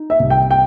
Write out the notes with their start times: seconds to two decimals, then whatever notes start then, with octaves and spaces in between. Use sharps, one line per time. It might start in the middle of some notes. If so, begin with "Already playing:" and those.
Already playing: D#4
0.10 E5
0.20 C2
0.30 G5
0.51 G5